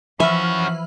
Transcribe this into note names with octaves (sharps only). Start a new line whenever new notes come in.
E3 F3 C#4 F#4 E5 B5 F6